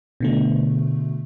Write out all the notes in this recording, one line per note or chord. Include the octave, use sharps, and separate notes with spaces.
B2 D3 A3